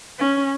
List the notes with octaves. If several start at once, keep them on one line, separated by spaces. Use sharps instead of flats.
C#4